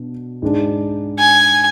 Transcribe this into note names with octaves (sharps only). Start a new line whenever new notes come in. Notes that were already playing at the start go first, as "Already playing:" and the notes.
Already playing: B2 D4
G#2 G#3 D4
G#5